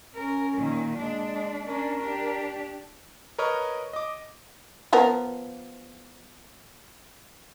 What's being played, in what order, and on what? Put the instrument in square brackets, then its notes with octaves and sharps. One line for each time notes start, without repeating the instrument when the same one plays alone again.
[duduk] C#4 [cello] A#4
[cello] A#2 D#3
[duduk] G#3 [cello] D4
[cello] C#4 D4 [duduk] A#4
[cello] D4 G4
[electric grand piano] A#4 B4 C#5 D#5 F6
D#5 D6
[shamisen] F3 B3 A#4